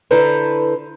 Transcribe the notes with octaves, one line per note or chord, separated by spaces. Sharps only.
D3 E4 A4 B4 C5 A#5